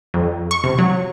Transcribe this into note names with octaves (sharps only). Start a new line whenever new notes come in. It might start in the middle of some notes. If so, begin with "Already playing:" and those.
F2
C#6
C3
F#3